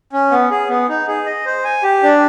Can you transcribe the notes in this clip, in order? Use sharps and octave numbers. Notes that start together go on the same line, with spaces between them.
C#4
B3
G#4
B3
D#4
G#4
D#5
C5
G#5
G4
D4